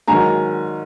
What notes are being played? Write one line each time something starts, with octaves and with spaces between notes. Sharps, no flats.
G#2 D#3 F#3 G#5 A#5